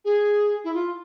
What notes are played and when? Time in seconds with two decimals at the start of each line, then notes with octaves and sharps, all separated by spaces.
0.05 G#4
0.64 E4
0.74 F4